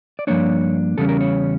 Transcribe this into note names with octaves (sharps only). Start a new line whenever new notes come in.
D5
G2 F3 A#3 D4 C#5
E2 C#3 G3 C#4 A4
A#4
C#5